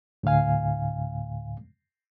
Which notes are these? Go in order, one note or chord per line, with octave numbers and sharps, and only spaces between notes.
D2 A2 D3 F5 G#5